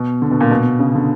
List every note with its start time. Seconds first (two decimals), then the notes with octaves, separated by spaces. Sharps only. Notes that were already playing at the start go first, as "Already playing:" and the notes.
Already playing: B2
0.22 D3
0.31 B2
0.41 A#2
0.51 B2
0.79 C#3
0.95 D3